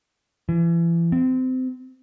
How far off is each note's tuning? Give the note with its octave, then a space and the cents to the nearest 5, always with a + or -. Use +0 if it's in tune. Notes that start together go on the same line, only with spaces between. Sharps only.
E3 +35
C4 -25